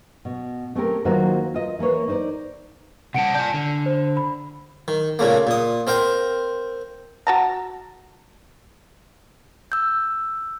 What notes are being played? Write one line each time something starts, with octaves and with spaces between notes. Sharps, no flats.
B2
A3 C4 C#4 G4 A#4
D#3 F#3 A#3 F4 F#4 C5
F4 D#5
E3 A#3 B4 C#5
D#4 C5 D5
C3 G3 F#5 A5 C#7 D7
D5 G#5 A5 G6
D3
C5
B5
D#3
A#2 C#3 A3 A#3
A#2 D#6
C4 A#4 F5 G5
F#4 A5 A#5
E6 G6